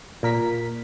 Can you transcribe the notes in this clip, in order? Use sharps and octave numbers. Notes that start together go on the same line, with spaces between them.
A#2 A#4 B6